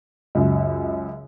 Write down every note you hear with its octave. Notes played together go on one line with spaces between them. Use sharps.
C#2 F#2